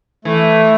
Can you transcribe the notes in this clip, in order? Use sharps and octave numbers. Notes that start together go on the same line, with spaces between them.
E3 A3